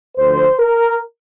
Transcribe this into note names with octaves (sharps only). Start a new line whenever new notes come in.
D2 D3 F3 C5
A#4